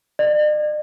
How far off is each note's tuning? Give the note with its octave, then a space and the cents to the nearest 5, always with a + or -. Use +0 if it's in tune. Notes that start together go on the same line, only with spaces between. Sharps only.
D5 +45